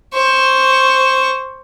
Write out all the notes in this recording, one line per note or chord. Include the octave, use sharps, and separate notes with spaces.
C5 C#6